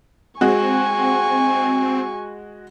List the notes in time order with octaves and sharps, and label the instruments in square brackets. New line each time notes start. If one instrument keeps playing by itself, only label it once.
[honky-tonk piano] G#3 F#4 [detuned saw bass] C4 [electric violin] G#5 C#6